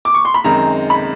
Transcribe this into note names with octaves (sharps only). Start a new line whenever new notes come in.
D6
C#6
C6
B5
F#2 D#3 G#3 C4 A#5
B5